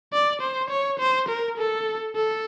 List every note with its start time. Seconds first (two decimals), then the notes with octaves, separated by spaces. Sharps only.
0.13 D5
0.41 C5
0.70 C#5
0.99 C5
1.29 A#4
1.58 A4
2.15 A4